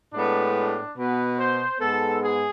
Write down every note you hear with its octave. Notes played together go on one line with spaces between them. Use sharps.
A2 G#3 B3 D4
D4
B2 B3 B4
C5
G#2 G#3 B3 A4
G#4